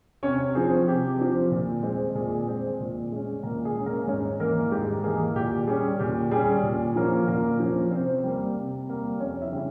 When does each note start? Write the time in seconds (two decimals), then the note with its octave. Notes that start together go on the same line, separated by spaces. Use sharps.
0.23 C3 C#4 C#5
0.55 F3 C4 G#4
0.87 C3 G4
1.19 F3 C4
1.51 A#2
1.83 G#3 C4
2.15 A#2 G#4
2.47 G#3 C4
2.80 A#2
3.12 G#3 C#4
3.43 A#2 A#3 A#4
3.65 G#4
3.75 G#3 C#4
3.86 A#3 A#4
4.07 G#2 C#4 C#5
4.40 E3 A#3 A#4
4.71 G#2 G4
5.04 E3 A#3 G#4
5.36 A#2 G4
5.67 G3 C#4 G#4
5.99 A#2 G4
6.31 G3 C#4 G#4
6.63 A#2
6.96 F3 A#3 C#4
7.27 A#2 A#3 A#4
7.60 F3 A#3 C#4
7.91 C3 C4 C5
8.23 G3 A#3
8.56 C3
8.89 G3 A#3
9.20 F2 C#4 C#5
9.41 E4 E5
9.52 C#3 G3 C#4